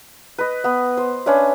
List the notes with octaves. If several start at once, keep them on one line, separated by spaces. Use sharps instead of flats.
B4 D#5
B3
C5
C#4 D4 B4 E5